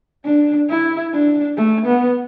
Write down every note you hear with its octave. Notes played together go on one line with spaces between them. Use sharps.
D4
E4
D4
A3
B3